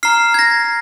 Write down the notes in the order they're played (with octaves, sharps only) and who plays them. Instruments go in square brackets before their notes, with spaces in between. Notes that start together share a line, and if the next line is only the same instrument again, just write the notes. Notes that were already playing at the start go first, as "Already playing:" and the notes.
[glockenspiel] A#5 F6 C7
G#6
A#6